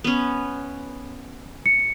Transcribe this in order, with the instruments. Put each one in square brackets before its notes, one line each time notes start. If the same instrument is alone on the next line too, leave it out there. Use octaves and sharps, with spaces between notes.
[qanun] B3 C#4
[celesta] C#7